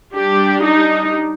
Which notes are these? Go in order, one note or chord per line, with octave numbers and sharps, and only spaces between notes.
G3 D4 G4
D#4